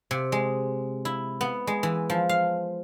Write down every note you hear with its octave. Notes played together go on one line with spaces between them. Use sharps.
C3
G#3
E4
B3
G#3
E3
F3
F5